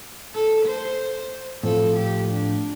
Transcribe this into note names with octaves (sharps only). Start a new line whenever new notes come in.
A4
C5
A2 F3 C4 F4 A4
G4
D4